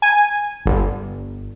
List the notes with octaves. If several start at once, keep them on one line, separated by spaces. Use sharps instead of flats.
G#5
G1